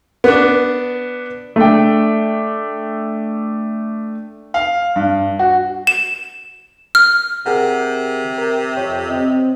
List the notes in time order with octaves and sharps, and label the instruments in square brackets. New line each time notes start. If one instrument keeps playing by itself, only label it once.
[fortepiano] B3 D4
[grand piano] A3 D4 G5
F5
G2
F#4
[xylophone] E7
F6
[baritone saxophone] C3 [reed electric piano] G#4 A#4 F#5
[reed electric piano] A#4
[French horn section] F2 [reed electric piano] C#5
[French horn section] C4 [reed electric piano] D#5